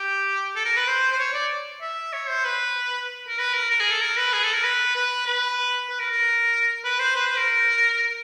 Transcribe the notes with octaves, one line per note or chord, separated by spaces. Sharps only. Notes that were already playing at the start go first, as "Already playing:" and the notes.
Already playing: G4
A4
A#4
B4
C5
C5
C#5
D5
E5
C#5
C5
B4
A#4
B4
A#4
A#4
G#4
A4
A#4
B4
G#4
A4
A#4
B4
B4
B4
B4
A#4
A#4
B4
C5
B4
C5
A#4